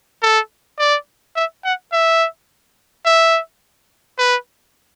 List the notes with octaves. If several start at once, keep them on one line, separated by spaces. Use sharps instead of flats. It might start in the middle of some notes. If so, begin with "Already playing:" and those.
A4
D5
E5
F#5
E5
E5
B4